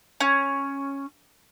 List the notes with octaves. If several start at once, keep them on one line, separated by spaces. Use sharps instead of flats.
C#4